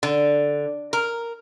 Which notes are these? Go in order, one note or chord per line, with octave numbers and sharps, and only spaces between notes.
D3
A#4